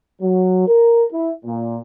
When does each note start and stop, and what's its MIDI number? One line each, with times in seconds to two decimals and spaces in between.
0.22 0.65 54
0.67 1.06 70
1.12 1.33 64
1.45 1.79 46